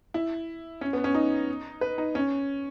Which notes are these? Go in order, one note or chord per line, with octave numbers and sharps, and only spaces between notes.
E4
C#4
B3
C#4
D#4
B4
D#4
C#4